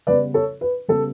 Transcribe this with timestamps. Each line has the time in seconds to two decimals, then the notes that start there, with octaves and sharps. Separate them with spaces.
0.07 C#3 G3 B3 B4 D5
0.34 A4 C#5
0.61 B4
0.88 C#3 G3 B3 A4